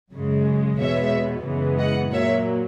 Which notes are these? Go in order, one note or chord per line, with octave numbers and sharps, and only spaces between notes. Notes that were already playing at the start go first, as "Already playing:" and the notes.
F#2 C#3 G#3
E2 B2 G#3 B3 C#5 E5
F#2 C#3 E3 G#3 B3
D#5 F#5
A#2 F#3 A#3 C#5 E5